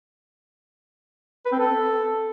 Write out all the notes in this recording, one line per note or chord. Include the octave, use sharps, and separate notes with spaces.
B4
C4
A4